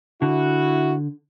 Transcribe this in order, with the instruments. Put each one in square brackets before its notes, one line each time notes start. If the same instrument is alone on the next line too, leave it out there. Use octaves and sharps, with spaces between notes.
[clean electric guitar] D3 [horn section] E4 F#4